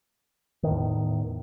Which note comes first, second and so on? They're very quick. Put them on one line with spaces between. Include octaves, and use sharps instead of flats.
D#3 A2 E2